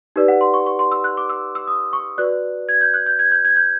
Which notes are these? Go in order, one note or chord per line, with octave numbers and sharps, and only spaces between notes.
D#4 G4 B4 D5
F#5
C6
C#6
C#6
C6
E6
F#6
D6
E6
E6
D#6
C#6
F#4 B4 D5 F#6
G#6
G6
F#6
G6
G#6
G6
G#6
G6